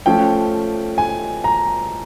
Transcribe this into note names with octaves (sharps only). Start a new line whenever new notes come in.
F3 A3 C#4 G5
G#5
A#5